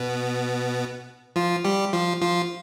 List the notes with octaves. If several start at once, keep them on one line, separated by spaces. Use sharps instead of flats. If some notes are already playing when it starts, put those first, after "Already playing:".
Already playing: B2 B3
F3 F4
G3 G4
F3 F4
F3 F4